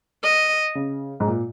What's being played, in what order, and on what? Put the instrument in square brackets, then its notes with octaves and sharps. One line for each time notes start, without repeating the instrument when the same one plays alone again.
[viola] D#5
[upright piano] C#3
G#2
A#2